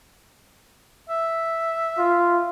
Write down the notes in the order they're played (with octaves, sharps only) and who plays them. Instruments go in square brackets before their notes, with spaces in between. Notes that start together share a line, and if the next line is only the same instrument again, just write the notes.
[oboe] E5
[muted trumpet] F4